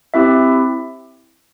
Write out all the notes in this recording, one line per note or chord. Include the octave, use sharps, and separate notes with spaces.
C4 E4 G4 E5